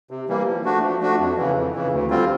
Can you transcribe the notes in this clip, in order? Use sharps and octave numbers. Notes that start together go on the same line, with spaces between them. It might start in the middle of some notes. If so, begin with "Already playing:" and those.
C3
E3 G3 A#3
F3
A3 D4 F#4
F3
A3 D4 F#4
F2
C#3 E3
F2
C#3 E3
D2
D3 G3 C4 F4